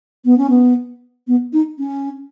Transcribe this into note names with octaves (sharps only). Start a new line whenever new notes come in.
B3
C#4
B3
B3
D#4
C#4